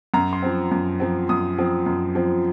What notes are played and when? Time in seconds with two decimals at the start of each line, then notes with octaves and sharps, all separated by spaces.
0.14 F#2 A#5
0.33 C6
0.43 F3 C4
0.72 F#2
1.00 F3 C4
1.29 F#2 D#6
1.58 F3 C4
1.86 F#2
2.15 F3 C4